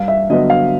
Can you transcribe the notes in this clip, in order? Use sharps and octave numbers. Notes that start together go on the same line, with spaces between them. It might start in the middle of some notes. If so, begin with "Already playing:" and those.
Already playing: G2 F5
E5
D3 F#3 B3 D#5
F5